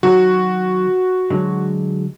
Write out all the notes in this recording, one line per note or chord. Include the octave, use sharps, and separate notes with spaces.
D#3 F#3 F#4
D3 F#3 G#3